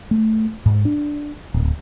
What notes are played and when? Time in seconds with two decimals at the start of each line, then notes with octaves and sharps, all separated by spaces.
0.11 A3
0.66 G#2
0.85 D4
1.54 D1